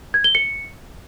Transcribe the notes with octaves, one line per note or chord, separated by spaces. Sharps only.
G#6
G7
C#7